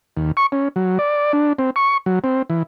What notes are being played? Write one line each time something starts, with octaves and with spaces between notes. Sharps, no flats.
D#2
C#6
C#4
F#3
D5
D4
C4
C#6
F#3
C4
E3